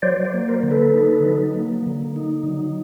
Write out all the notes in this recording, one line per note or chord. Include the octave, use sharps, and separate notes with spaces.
F#3 C5 D5
C5 D5
A#3
A#4 C5
D3
A4 B4
D#4
F#3
A#3
D3
D#4
F#3